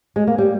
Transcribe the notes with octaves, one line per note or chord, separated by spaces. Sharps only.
G#3
A#3
G3